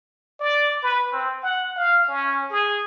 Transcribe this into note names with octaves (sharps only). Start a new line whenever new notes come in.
D5
B4
C4
F#5
F5
C#4
G#4